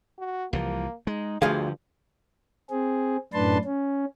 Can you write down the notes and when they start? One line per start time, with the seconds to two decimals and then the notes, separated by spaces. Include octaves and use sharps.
0.19 F#4
0.53 C2 E3 F3 A#3
1.07 G#3 D#4
1.42 D2 G2 D3 E3 F3 G#4 F5
2.70 C4 G#4
3.33 F#2 A2 D4 B4 A5 C6
3.64 C#4